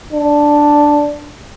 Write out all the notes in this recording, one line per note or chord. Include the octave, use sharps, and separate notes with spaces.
D4